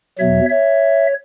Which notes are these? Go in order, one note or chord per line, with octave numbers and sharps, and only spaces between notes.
E2 B2 F#3 C#5 E5
C#5 E5